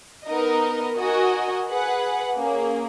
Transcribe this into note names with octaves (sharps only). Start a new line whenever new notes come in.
B3 D#4 A#4 D#5
F#4 A#4 D#5 G#5
G#4 B4 F#5
A#3 C#4 G#4